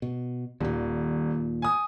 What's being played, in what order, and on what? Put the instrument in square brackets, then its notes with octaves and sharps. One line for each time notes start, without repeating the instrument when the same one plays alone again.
[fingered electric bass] B2
[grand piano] D#1 [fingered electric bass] D#2 A#2
[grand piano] G#5 D#6